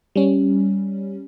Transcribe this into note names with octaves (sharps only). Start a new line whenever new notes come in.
G3 C#4